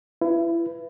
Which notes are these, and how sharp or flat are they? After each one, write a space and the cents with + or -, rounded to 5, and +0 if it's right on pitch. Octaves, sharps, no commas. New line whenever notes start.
E4 +30 B4 +10